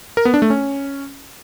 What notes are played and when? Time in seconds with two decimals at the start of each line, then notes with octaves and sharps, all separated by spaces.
0.17 A#4
0.25 B3
0.34 D4
0.42 A3
0.50 C#4